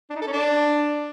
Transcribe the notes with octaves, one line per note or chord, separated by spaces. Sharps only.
D4
D#4
A4
C#4
D4